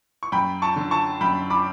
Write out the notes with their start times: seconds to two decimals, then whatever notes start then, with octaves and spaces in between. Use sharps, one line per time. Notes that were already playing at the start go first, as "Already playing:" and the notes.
0.23 C#6
0.32 F#2 G5 B5
0.62 A5 C#6
0.76 D3
0.91 A5 C#6
1.21 F#2 G5 B5
1.50 B5 D6